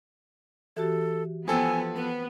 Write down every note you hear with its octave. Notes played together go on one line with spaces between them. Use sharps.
E3 F#4 G4 A4
F3 B3 A4 C5 G5 G#5 E6
B3 B4